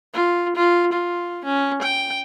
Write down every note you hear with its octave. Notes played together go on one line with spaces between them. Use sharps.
F4
F4
F4
C#4
G5